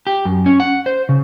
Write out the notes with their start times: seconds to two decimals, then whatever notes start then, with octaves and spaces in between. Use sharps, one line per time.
0.07 G4
0.25 F#2
0.46 C#4
0.60 F#5
0.86 C5
1.09 C#3